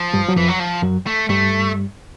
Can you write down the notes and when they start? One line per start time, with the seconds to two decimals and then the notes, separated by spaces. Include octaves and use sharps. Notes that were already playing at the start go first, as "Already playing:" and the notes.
Already playing: F3
0.14 G2 G3
0.29 F#3
0.36 F2 E3 F3
0.48 F#3
0.59 F3
0.82 F#2 F#3
1.07 A3
1.29 G2 G3 A3